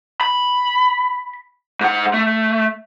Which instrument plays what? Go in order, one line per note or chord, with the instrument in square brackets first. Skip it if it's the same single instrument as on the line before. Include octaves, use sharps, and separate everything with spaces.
[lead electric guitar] B5
G#2 F#5
A3